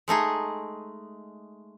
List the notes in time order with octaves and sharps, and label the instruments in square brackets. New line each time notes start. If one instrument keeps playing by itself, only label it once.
[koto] G#3 A3 D#4 G#4